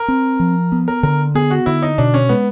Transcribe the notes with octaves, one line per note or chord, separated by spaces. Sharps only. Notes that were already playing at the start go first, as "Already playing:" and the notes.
Already playing: A#4
C4
F3
B3
A#4
D3 A#4
B3 G#4
F#4
D3 E4
D#4
B2 D4
C#4
G#3 B3